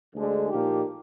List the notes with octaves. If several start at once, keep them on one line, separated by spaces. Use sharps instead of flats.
D2 D3 G#3 D4 G#4
A#2 F3 A#3 D#4 G4